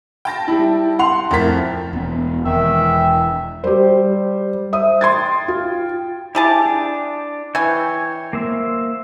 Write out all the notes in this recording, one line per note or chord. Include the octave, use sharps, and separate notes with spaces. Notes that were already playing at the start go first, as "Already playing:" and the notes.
G5 A5 A#6
G3 E4
F#5 C6 F7
F2 A2 A#4 A6 B6
E1 B3
E1 D#3 E5
G3 G4 C5
C5 E5 D#6
G5 C6 G#6 A6
F4
E4 G4 G#4 A5
D4
E3 C#5 G5 G#5
A#3 C5 E5